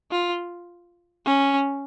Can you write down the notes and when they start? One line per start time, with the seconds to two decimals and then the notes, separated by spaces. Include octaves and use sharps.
0.11 F4
1.26 C#4